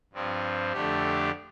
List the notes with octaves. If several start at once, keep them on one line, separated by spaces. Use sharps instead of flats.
G2 F3 C4
F2 D3 A3 D4 G4